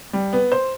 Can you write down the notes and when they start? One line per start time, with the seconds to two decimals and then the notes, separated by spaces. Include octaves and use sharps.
0.13 G3
0.33 B3
0.52 C5